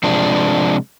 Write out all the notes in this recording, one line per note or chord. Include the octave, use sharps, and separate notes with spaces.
C3 F3 G#3 D4